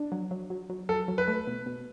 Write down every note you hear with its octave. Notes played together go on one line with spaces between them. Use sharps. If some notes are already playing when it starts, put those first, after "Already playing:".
Already playing: D4
F#3
F#3
F#3
F#3
F#3 A4
F#3
B4
A3
B2
B2